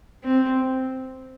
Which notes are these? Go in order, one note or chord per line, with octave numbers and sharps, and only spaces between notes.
C4